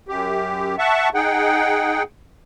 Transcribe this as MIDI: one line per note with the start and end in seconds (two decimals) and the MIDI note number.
0.08 0.76 42
0.08 0.76 67
0.79 1.09 76
0.79 1.09 78
0.79 1.09 81
0.79 1.09 85
1.14 2.03 63
1.14 2.03 68
1.14 2.03 78
1.14 2.03 79